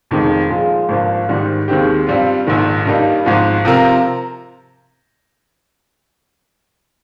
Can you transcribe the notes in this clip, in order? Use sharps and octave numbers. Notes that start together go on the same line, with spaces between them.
F1 F2 D#3 G#3 D#4
A#2 F3 G#3
G#1 G2 F3 A#3
G#1 G#2 D#3 G3
D#2 D#3 G#3 C4 G4
G2 G3 C4 F4
A#1 G#2 D#3
G2 G3 A#3 D#4
G#1 G#2 F3
C3 F3 C4 F4 A#4